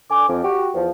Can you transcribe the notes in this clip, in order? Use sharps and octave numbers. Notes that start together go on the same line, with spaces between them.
D3 G#5 D6
F2
F#4 G4
E2 F3